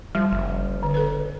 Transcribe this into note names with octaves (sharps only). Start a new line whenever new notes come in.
F3 G3
F#1
D3
A4 B4